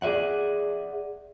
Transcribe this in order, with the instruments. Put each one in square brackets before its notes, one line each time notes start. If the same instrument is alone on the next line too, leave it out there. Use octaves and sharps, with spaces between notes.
[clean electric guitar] G#4 D5 E5 F#5